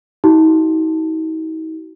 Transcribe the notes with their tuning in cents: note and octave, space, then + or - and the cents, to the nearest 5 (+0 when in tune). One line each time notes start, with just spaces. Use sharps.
D#4 +40 F#4 +40